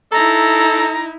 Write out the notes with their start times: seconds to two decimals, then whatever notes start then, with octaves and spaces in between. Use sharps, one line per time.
0.12 D#4 E4 A4 A#5